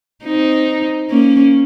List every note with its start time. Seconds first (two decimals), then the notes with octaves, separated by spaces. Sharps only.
0.25 C4 D#4
1.10 A#3 C#4